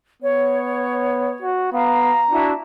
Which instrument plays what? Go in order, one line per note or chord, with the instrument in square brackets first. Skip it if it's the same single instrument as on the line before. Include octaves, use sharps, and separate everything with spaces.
[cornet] B3 [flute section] C#5
[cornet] F#4
[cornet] B3 [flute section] F5 [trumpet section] A#5
[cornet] D4 [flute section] E4 F#4